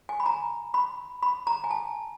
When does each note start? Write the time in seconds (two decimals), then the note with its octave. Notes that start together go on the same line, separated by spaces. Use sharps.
0.09 G#5
0.20 B5
0.26 A#5
0.74 B5
1.23 B5
1.47 A#5
1.64 G#5
1.71 A5